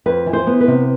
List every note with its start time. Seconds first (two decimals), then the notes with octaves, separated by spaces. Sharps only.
0.06 F2 B4
0.26 E3
0.33 C5
0.47 B3
0.60 B4
0.67 C3